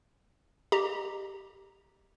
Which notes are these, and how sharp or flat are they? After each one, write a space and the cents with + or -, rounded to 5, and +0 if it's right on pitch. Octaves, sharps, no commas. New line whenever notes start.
G4 +0 D#5 -35 A#5 +0